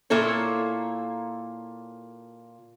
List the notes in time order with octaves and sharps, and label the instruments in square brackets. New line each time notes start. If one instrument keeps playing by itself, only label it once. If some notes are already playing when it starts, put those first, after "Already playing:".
[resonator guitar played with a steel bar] A#2 A#3 E4 A4 C#5